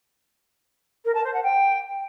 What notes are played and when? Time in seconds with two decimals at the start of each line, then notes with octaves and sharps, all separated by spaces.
1.05 A#4
1.14 A5
1.24 C5
1.33 F#5
1.43 G5